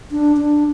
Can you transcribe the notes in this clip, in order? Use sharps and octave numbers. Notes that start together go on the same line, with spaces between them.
D4
D4